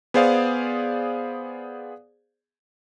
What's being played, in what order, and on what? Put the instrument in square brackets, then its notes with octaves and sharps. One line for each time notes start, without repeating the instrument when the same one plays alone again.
[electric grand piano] B3 G#4 C5 D5 F5